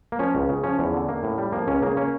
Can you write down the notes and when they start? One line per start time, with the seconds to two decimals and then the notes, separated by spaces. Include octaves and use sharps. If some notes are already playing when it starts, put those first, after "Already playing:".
0.12 A#3
0.19 F3 C#4
0.35 C#2
0.49 C#3
0.64 F3 C#4
0.79 E2
0.93 D3
1.09 A#3
1.23 A2
1.38 G3
1.52 F3 A#3
1.68 C#2 C#4
1.82 C#3 A#3
1.97 A#3 C#4